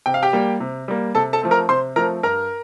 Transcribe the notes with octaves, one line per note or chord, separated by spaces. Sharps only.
C3 G5
F5
G4 G5
G3 A#3
C3
G3 A#3
C3 A4 A5
A4 A5
F3 A3 C4
A#4 A#5
C3 C5 C6
F3 A3 C4 A#4 A#5
G2 A#4 A#5